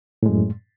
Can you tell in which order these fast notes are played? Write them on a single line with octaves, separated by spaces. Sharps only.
A2 G#3 F#2